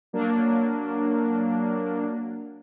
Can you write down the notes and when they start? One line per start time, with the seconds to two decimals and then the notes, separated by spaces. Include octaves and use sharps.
0.13 F#3 A#3 D4